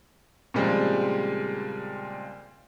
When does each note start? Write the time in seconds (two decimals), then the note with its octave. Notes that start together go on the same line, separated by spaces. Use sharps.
0.54 A#2 C#3 F3 G3 G#3 C4